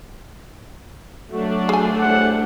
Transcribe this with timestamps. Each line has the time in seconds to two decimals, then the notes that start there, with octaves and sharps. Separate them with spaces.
1.31 F#3 A3 D4 F#4
1.69 G#4 G#5
2.00 A2 G3 C5 F#5